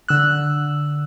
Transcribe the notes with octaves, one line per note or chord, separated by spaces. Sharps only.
D3 E6 F#6